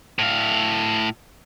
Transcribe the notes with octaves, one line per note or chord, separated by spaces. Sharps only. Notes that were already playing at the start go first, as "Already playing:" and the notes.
A2 F5